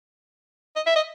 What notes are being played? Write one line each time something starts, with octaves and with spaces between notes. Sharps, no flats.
D#5
E5
D#5